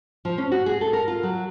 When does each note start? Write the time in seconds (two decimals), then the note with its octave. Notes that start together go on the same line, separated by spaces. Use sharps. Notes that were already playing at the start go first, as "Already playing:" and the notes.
0.25 F3
0.38 C#4
0.52 F#4
0.66 G#4
0.81 A4
0.93 A#4
1.08 F4
1.23 F#3